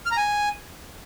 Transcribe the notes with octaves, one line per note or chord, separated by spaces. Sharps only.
F6
A#5
G#5